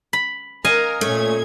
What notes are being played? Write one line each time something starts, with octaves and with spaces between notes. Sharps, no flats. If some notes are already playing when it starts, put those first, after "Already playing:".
B5
A#4 D#5 F5 G#5
A#2 A3 C#4 G#6